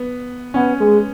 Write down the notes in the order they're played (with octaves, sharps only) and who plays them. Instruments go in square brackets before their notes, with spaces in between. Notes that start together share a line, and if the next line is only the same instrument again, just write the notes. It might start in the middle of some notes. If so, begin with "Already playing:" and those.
Already playing: [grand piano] B3
[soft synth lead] B3 [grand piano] C#4
[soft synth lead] G#3